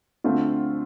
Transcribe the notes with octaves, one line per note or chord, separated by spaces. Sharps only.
D2 D3 A3 C4 F4